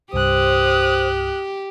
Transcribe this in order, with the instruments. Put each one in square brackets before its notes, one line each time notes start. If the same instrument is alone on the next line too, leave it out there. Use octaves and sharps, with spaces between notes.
[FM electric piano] C2 G2 [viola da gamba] G4 [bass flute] C5 [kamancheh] D#6 F#6